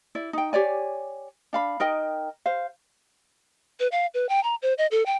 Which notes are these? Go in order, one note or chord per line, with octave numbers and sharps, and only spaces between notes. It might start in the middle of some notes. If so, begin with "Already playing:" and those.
E4 D5
D#4 G5
G4 C#5 D5 G#5
D4 F5 B5
D#4 A#4 D#5 G5
C5 F5
B4
F5
B4
G5
A#5
C5
D#5
A4
G5